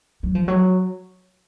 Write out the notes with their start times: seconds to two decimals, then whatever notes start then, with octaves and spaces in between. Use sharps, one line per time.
0.23 F#3
0.35 F3
0.48 F#3